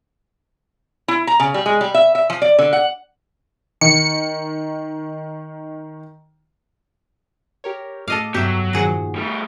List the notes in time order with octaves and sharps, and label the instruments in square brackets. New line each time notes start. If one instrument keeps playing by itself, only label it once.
[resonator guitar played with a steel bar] E4
A#5
C#3
G3
G#3
G3
E5
E5
F3
D5
D3
F#5
[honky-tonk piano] D#3 [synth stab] C#7
[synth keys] G4 A#4 C#5
[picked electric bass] A2 [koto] A4 D#5 F5 [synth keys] D6
[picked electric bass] F1 G2 B3 [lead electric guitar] F#3 [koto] G4 E5
[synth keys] A#2 D#3 F3 [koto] F#4 G#4 F#5
[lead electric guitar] G3 A3